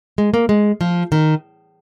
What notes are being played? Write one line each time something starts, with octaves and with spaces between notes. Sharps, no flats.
G#3
A#3
G#3
F3
D#3